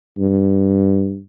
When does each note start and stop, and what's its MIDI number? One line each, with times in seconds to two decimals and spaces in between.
0.18 1.20 43